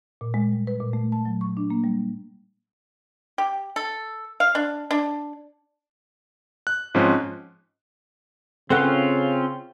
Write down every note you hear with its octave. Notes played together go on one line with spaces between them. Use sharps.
A#2
G#3
G3
B4
A#2
A3
A5
F#3
C#6
D4
A#3
G3
G4
A4
F5
D4
D4
F#6
G#2 F3 C4 C#4
C#3 C4 C#4 F4 A4 B4 F#5